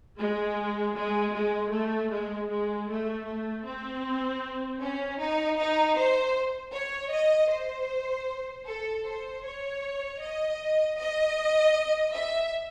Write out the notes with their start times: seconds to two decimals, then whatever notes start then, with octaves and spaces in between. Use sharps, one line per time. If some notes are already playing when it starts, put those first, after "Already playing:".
0.18 G#3
0.95 G#3
1.34 G#3
1.72 A3
2.11 G#3
2.50 G#3
2.89 A3
3.27 A3
3.65 C4
4.80 C#4
5.19 D#4
5.58 D#4
5.97 C5
6.74 C#5
7.12 D#5
7.50 C5
8.67 A4
9.05 C5
9.44 C#5
10.21 D#5
10.98 D#5
12.14 E5